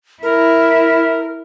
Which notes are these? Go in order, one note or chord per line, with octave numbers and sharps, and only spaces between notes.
E4 A#4